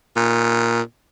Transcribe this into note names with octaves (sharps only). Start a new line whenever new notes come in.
A#2